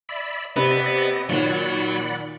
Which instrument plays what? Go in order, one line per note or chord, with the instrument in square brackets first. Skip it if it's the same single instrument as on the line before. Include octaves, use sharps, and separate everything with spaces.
[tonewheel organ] D5 E5 B5
[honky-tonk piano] C3 B4 [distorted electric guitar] B3 [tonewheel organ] D5 D#5
[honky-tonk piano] A#2 D#3 [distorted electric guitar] F#3 [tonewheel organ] D5 F#5 B5